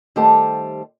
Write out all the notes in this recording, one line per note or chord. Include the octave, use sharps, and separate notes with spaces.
D#3 G3 A3 G4 C5 A5